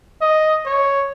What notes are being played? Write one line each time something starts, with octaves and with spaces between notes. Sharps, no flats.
D#5
C#5